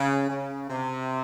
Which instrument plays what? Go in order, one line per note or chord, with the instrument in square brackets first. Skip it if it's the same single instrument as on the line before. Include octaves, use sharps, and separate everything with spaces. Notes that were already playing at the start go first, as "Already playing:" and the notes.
Already playing: [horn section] C#3
C#3
C3